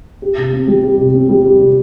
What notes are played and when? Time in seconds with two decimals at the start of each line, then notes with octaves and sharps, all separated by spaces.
0.22 G4
0.37 C3
0.53 C4
0.68 G3
0.83 G4
0.99 C3
1.14 C4
1.29 G3
1.45 G4
1.60 C3